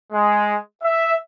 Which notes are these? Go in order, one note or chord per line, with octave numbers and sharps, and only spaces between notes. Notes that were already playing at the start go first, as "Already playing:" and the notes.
G#3
E5